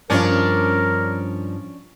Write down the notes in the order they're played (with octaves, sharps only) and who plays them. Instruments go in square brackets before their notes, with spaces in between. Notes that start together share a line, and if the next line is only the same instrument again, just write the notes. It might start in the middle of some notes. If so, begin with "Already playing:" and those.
[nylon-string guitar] G2 F3 F5 [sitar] C#4 D4 [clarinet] A#4